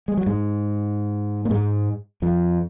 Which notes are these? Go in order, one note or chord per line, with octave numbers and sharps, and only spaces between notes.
G#3
F#3
G#2 G#3
A#3
G#2 G#3
F2 F3